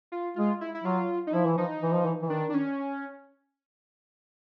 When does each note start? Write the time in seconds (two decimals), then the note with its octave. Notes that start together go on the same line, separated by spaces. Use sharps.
0.12 F4
0.36 G#3 F4
0.61 E4
0.75 E4
0.84 F#3 F4
1.27 D#4
1.33 F3 E4
1.45 E3
1.58 F3 D#4
1.82 E3
1.93 F3
2.05 E3
2.22 E3
2.30 D#3 D4
2.50 D4
2.54 C#4